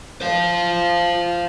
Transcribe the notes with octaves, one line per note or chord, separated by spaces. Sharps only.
C5 F5